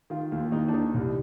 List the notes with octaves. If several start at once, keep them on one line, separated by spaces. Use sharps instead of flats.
D#3 F4
D#2 F4
D#2 D#4
D4
D#3 D#4
C2